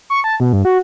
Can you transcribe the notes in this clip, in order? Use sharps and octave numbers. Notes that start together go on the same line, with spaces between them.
C#6
A5
B2
G2
F#4